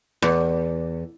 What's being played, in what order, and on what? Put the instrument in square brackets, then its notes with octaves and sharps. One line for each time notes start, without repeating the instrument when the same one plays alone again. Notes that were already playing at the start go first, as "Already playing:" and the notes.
[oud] E2